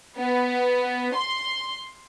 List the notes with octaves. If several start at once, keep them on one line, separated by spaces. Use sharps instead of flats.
B3
C6